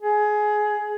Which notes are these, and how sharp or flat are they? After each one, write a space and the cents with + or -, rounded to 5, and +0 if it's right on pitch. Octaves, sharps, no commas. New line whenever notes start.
G#4 +20